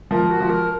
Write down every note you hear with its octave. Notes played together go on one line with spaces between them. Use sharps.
F3 A#4
F#4
F3
A#4